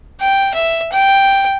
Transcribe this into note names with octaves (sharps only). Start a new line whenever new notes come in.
G5
E5
G5